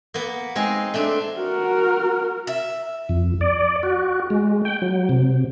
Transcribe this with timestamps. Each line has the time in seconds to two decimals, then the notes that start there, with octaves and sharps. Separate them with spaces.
0.14 A#3 B3
0.56 G#3 C4 D#4 G#4 D#5
0.94 A3 C4 D4
1.37 F#4 A#4
2.47 E5
3.09 F2
3.41 D5
3.83 F#4
4.30 G#3
4.65 G5
4.82 F#3
5.09 C3